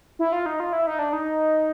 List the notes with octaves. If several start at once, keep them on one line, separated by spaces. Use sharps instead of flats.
E4
F4
D#4
F4
E4
D#4
D4
D#4